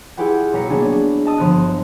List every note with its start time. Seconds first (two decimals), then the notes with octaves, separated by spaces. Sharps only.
0.17 E4 F4 G4 G#4 B4 F#5
0.53 B1 G3 A#5 B6 C#7
0.69 F#3 A#3 B3 D4 G#4
1.25 D#5 A5 D#6 E6
1.38 G1 F3 B3 F#6